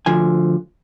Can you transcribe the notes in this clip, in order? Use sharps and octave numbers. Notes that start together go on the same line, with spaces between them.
D2 D3 F3 G#5